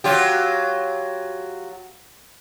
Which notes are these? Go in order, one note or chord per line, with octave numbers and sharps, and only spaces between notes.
F#3 F4 G4